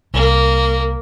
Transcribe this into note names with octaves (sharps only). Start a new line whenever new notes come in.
C2 A#3